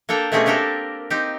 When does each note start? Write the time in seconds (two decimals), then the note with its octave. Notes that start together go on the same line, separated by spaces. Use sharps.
0.09 A#3 D4 A4 G5 A#5
0.32 B2 A3 C4 C#4 G4 G#4
0.46 A#3 D4 G4 A4 A#4
1.10 C4 D#4 G4